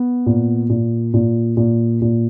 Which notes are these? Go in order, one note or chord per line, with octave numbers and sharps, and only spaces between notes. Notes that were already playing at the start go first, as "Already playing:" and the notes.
Already playing: B3
A#2
A#2
A#2
A#2
A#2